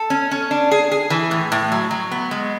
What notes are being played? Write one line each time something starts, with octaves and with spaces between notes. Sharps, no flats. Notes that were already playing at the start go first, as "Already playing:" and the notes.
Already playing: A4
C#4
C#4
D4
G#4
G#4
E3
A2
A2
F#3
F#3
B3
G#3